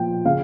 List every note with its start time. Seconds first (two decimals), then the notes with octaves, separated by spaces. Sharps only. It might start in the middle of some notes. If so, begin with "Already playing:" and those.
Already playing: A#2 F3 G5
0.25 C#3 F5